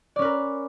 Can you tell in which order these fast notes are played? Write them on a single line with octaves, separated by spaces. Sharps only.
D5 C#4 B4 A#4